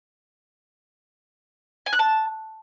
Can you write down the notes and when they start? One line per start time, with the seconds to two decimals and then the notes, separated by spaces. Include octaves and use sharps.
1.86 G#5
1.93 F#6
1.99 A5